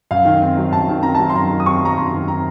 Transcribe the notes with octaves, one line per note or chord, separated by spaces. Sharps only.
F#2 F5
D#3
C4
F#3
F#2 A5
D#3
C4 A#5
F#3 A5
C6
F#2 A#5
D#3
D#6
C4 C#6
F#3 A#5
F#2 C6
D#3
C4 A#5